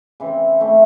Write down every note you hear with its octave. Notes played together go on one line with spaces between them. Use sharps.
C#3 E3 C4
E3 A3 C4